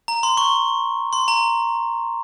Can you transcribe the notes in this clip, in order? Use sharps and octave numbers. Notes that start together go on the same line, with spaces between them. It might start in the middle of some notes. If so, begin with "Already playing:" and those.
A#5
C6
C#6
C6
A#5